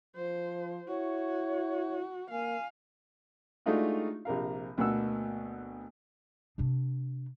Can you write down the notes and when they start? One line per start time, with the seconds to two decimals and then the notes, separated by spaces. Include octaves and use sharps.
0.16 F3 C5
0.88 E4 F#4 C#5
2.31 A#3 F5 G#5
3.66 G#3 A3 D4 D#4 F4 F#4
4.25 A#1 C3 A#4 F5
4.77 D2 B2 A#3 F#5 E6
6.58 C3 D4